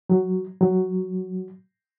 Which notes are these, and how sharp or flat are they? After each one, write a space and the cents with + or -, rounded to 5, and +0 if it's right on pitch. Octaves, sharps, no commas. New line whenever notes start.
F#3 +5
F#3 +5